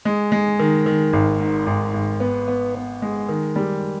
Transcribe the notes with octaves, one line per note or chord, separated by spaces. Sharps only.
G#3
G#3
D#3
D#3
G#1
G#2
G#1
G#1
B3
B3
B3
G#3
D#3
G3